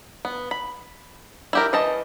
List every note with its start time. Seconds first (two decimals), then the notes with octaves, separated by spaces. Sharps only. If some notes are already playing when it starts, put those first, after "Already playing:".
0.25 B3
0.51 B5
1.53 E4 G4 A#4
1.73 E3 D#5 A5